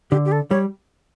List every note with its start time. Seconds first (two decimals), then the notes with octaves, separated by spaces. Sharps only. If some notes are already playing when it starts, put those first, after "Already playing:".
0.11 D3 G4
0.25 G4
0.32 A4
0.51 G3 C#5